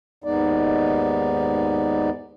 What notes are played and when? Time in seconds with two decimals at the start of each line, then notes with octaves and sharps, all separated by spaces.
0.24 D#2 G#2 G#3 B3 D#4 D5